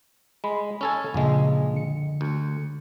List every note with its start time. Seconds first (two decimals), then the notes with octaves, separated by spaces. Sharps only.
0.44 G#3 B5
0.81 C#4 A4 G#5
1.14 A#1 F#2 A#2 C#3 G#3
1.73 D3 C#7
2.21 D2